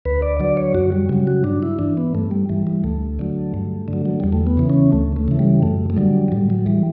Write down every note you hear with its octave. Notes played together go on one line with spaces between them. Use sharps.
D2 B4
D5
D3 F#3 D5
C#5
F#2 F#4
G3
C#3 F#3 G3
F#4
G2 D4
E4
E3 D4
B3
G2 A3
G3
E3 G3
G3
D2 A3
D3 F#3
G2
D3
F#3
F#3
E2 G3
A3
B3
C#3 E3
C#4
D2 A3
A3
C#3 E3
G3
F#2 A3
A3
D3 F#3 G3
F#3
A2 G3
F#3
E3 G3